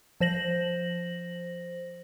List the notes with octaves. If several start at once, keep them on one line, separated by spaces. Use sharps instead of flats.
F3 C5 A#6 F#7